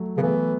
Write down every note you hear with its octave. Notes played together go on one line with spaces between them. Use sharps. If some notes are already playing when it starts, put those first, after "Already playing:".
Already playing: F#3 A3
C#3 B3
E3 A3